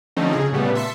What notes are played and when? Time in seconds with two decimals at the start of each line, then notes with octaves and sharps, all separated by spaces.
0.16 D3 F3 A3 C4 C#4 D#4
0.33 C#3 G#4
0.52 A#2 C#3 G3 A3 B3
0.75 E5 A5 C6 B6 C#7